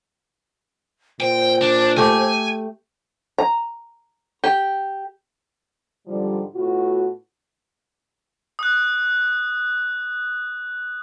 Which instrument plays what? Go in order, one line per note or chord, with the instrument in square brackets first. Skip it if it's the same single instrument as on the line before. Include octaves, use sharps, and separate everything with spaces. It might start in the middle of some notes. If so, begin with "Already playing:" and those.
[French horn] A#2 [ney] C5 [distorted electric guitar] G5
[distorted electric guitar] D4
[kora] A3 G4 [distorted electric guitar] G#5
[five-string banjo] A#5
G4
[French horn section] G#2 D3 F3 G3
A2 B3 F4 F#4
[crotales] D#6 F#6